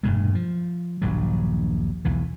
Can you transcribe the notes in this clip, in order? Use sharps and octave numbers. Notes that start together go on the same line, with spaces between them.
E1 G2 A#2 G#3
F3
D#1 A#1 G2 F#3
B1 E2 E3